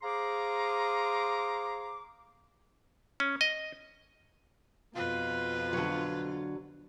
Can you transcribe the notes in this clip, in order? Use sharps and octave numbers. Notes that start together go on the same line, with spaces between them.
G#4 C5 F5 A#5 C6 D6
C#4
D#5
F2 B2 F4 B4
D3 F#3